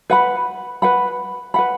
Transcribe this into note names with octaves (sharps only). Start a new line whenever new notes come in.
B4 F#5 B5
B4 F#5 B5
B4 F#5 B5